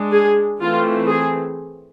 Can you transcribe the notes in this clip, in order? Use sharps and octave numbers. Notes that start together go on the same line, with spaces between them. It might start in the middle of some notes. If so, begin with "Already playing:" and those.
Already playing: G#3 D4
G#4
E3 A3 C4 F4
G#4